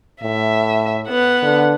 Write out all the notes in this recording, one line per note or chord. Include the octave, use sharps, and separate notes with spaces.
A2 E5
B3 F#5
D3